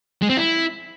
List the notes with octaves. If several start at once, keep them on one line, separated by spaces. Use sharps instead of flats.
G#3
C4
E4